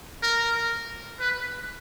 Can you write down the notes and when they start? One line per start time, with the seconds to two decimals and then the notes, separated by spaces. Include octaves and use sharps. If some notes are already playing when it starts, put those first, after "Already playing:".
0.23 A#4
1.20 B4